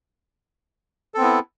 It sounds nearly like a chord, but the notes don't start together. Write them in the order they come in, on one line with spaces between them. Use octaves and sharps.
A4 C4 B3 E4